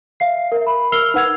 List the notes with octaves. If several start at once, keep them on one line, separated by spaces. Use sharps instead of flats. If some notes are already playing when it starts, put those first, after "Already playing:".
E5 F5 C7
A#4 E5
B5
A#4 E6 F6 C7 F7 G7
D#4 B4 F#5 E6 G#6 F7